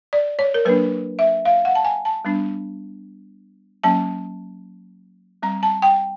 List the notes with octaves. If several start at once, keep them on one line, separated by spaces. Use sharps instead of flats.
D5
C#5
A#4
F#3 A#3 D4 B4
E5
F5
F#5
A5
G#5
A5
G3 B3 D4
F#3 A#3 C#4 A5
G3 C4 A#5
A5
G5